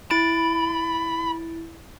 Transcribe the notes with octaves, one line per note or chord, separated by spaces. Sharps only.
E4 B5 A6 D7